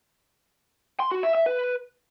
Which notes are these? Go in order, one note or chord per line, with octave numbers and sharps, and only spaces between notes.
C6
F#4
E5
E5
B4